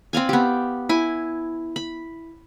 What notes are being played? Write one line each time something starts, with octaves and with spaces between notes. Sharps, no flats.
C4 D5 F5 G#5
B3 G4
E4 G#5
B5